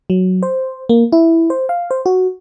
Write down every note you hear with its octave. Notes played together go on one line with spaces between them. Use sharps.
F#3
C5
A#3
E4
C5
F5
C5
F#4